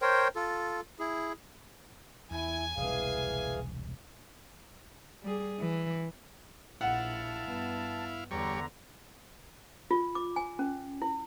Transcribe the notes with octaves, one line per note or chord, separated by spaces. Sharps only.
A#4 C5 C#5 G5
F4 A4
E4 G#4
E2 E4 G#5
E1 C2 E3 G#4 F5
G3 G#4
E3
A#1 E4 F5 F#5 A5
G2 B3
E2 D3 G3 C#5 A#5
F4
D6
G#5
C#4
E4